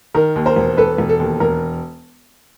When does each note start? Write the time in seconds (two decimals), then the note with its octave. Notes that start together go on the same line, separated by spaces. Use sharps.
0.14 D#3 A#4
0.36 D#2
0.46 A#4 C5
0.56 E1
0.77 E1 A4 B4
0.98 E1
1.09 A4
1.20 D#2
1.40 E1 A#4